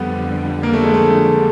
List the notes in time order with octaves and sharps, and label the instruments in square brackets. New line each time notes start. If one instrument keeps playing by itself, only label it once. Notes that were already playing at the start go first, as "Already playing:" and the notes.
Already playing: [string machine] F2 D3 G3 [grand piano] B3
[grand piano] A#3
A3
G#3
A3